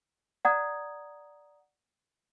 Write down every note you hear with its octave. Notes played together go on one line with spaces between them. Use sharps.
D5 F#5 A#5 D#6 G#6